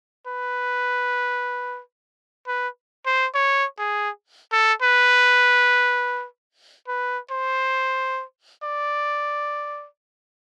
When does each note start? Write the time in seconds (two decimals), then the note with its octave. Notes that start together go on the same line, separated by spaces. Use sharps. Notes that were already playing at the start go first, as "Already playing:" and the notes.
0.27 B4
2.47 B4
3.06 C5
3.35 C#5
3.79 G#4
4.52 A4
4.82 B4
6.88 B4
7.31 C5
8.63 D5